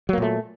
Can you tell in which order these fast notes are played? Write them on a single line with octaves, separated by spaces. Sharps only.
F#3 A#3 A#2 A3